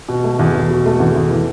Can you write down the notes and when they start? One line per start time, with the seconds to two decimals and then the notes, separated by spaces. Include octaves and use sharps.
0.08 B2
0.24 A3
0.39 E2
0.55 E2
0.70 B2
0.86 A3
1.00 E2
1.16 E2
1.30 E3